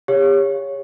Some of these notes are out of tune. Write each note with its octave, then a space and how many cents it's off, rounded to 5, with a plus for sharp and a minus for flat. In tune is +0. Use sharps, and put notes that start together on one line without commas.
G4 +40 C#5 +0 F5 +0